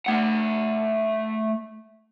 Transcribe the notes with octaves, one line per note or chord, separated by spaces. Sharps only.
A3 F#5